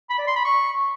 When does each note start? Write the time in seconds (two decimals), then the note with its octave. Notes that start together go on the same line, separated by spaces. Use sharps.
0.10 B5
0.19 D5
0.27 C6
0.36 B5
0.45 C#6